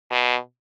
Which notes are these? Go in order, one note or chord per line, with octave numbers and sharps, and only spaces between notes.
B2